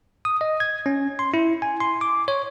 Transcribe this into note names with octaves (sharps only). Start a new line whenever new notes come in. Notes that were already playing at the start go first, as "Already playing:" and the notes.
D#6
D#5
G#6
C#4
C6
E4
G#5
C6
D6
C#5